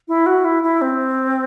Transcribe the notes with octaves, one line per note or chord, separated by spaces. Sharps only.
E4
F#4
E4
E4
C4